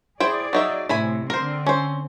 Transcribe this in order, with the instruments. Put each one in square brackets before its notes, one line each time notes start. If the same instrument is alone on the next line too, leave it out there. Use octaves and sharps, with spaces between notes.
[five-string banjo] E4 C5 G5 [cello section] G#4 D5
[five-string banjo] F#3 D#4 E5
[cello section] A2 C3 [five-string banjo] E4 G#5 B5
[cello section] D3 C4 [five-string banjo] A#4 C5
[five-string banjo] C#4 C5